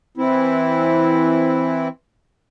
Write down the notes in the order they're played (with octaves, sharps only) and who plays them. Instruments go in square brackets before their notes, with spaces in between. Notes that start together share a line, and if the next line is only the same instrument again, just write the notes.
[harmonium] E3 C4 E4